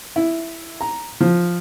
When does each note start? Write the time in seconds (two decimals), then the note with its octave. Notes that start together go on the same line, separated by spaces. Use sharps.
0.16 E4
0.81 A#5
1.21 F3